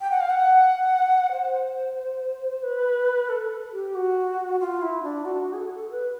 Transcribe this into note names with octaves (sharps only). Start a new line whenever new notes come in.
G5
F#5
F5
F#5
C5
B4
A4
G4
F#4
F4
E4
D4
F#4
G#4
A4
B4